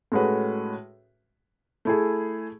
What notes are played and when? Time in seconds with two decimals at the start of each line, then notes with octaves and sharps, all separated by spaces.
0.12 A2 G#3 C#4 F#4 B4
1.85 A3 E4 G#4